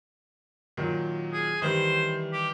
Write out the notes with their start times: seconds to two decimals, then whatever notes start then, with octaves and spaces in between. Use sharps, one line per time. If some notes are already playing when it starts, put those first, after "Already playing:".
0.77 A#2 D#3 F#3
1.33 G#4
1.62 D#3 E3 G3 C5
2.33 G4